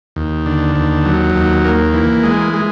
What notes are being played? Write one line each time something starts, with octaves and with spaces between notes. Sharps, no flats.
D#2
D3
D#2
F#3
D#2
A#3
E3
G#3
G#3